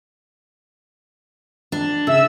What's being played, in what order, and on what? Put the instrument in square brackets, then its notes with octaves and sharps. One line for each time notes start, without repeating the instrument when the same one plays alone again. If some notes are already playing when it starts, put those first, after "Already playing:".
[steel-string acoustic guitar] D4
[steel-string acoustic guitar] C#3 [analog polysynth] E5 E6